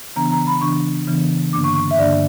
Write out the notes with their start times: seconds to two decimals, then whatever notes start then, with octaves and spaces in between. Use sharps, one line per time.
0.16 C#3 E3 B3 D4 A#5
0.32 A#5
0.47 B5
0.61 C#3 E3 B3 D4 C#6
1.07 C#3 E3 B3 D4
1.53 G2 D3 A#3 D4 D6
1.64 C#6
1.75 C#6
1.91 E5
1.98 G2 D3 A#3 D4 D5